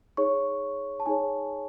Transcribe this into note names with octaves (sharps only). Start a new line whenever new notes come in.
D#4 G#4 C#5 C#6
A5
D#4 G#4 C#5 G#5